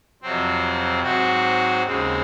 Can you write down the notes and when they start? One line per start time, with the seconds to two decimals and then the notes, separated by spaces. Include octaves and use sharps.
0.22 F2 C3 F#3 C4
1.03 G#2 F#3 C4 F#4
1.83 D#2 C#3 G#3 C4